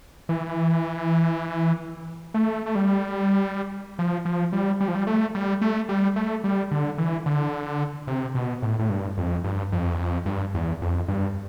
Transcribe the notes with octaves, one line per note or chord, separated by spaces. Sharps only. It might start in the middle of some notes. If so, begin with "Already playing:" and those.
E3
A3
A3
G3
F3
F3
G3
G3
F3
G3
A3
G3
A3
G3
A3
G3
D3
E3
D3
C3
B2
A2
A2
G2
F2
G2
F2
E2
F2
G2
E2
F2
G2